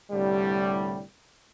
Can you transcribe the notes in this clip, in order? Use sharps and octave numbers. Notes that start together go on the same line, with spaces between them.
C2 A2 D3 G3